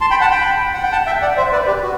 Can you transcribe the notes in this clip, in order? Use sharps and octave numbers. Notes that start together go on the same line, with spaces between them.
A5 C6
G5 B5
F#5 A5
G5 B5
F#5
G5
F#5 A5
E5 G5
D5 F#5
C5 E5
B4 D5
G4 B4
F#4